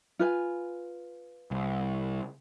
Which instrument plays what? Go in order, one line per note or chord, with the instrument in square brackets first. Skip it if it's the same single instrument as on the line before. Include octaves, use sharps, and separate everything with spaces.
[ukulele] F4 B4 G#5
[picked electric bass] C2